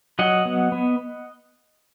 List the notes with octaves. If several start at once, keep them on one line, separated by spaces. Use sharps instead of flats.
F#3 D#5 F#5
B3
B3